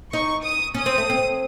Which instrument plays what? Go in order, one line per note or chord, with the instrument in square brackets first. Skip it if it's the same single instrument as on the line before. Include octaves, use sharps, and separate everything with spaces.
[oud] D#4 [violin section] C#6
[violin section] D#6
[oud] C#4 [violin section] D#6
[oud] C4
A3
C4